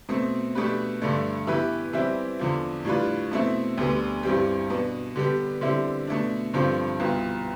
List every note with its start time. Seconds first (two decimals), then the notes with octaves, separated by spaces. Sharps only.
0.09 B2 A3 C4
0.55 B2 A3 D4 G4 B4
1.01 G2 D3 A3 D4
1.47 E3 B3 E4 G4 B4
1.93 E3 G3 C4 E4 G4
2.39 E2 D3 F3
2.85 A2 G3 D4 F4 B4
3.32 B2 A3 C4 E4
3.78 D2 D3 G3 B3
4.23 G2 E3 G3 C4 G4
4.70 B2 B3 D4
5.16 D3 G3 B3 D4 G4
5.61 D3 G3 C4 E4 G4
6.07 B2 A3 D4
6.54 G2 D3 F3 C4 G4
7.00 C2 B2 B3 F4